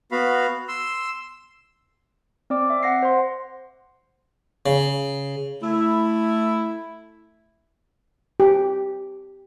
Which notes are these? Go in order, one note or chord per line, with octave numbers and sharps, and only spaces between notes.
B3 F#4 F5 B5
C6 E6
C4 D5 D6
E5
F#5 A#6 C7
C5 C6
C#3
A3 E4
G4